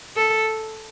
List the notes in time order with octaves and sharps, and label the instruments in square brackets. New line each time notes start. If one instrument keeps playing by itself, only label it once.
[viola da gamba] A4